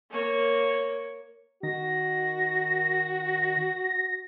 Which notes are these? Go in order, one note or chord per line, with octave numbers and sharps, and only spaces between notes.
A#3 C#5
D#3 F#4 A#6